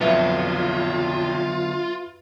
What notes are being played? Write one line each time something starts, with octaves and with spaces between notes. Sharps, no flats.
B1 F2 D3 F#3 B3 F4 B4 E5